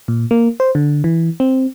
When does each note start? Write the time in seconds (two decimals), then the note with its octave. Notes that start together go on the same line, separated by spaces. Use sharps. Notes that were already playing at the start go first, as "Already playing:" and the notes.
0.08 A#2
0.31 A#3
0.60 C5
0.75 D3
1.04 E3
1.40 C4